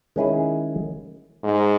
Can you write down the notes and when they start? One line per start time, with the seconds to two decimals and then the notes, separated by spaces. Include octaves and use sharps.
0.16 D#3 G#3 C#4 E4 G#4
1.44 G#2